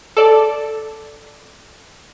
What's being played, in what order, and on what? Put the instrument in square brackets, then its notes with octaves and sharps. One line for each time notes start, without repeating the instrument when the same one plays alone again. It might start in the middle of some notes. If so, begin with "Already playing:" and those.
[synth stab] A4 D5